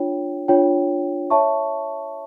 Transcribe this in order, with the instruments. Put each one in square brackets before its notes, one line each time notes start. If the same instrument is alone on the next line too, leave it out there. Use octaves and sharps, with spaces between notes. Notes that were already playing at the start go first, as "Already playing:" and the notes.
Already playing: [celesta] D4 F4 C#5 G5
D4 F4 C#5 G5
C#5 E5 A5 C#6